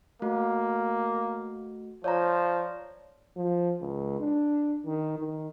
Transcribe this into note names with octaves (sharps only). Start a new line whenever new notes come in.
A3 A#3 F#4
F3 C#5 D5 A#5
F3
C#2
D4
D#3
D#3